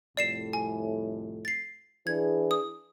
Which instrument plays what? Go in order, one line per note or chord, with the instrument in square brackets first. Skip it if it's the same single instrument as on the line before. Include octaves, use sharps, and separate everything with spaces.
[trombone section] C2 F2 A2 [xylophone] D5 C7 E7
[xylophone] G#5
A6 C7
[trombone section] E3 D4 G#4 [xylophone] G#6
[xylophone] D#6